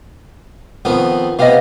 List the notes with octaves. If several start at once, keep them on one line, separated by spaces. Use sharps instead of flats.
F2 D#3 B3
C3 B3 D#5 F5